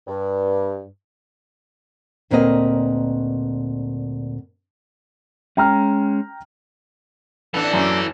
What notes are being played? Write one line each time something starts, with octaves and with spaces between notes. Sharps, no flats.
G2
D2 A#2 C4 A#4 B4 D#5
G#3 C#4 G5 A#5 F6
E3 B3 D4 A4
F#2 A3 A#3 C#4